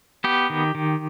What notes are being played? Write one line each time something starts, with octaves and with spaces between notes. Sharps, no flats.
B3 G4
D#3
D#3